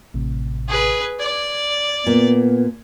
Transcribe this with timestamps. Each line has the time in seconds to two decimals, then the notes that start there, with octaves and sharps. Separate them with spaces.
0.14 A1 A2 C3
0.68 G#4 B4
1.19 D5 G#6
2.06 A#2 B3